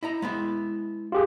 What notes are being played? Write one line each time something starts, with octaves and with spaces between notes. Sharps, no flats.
E4 D#5 A#5
G#3 B3 E4
F4 G4 G#4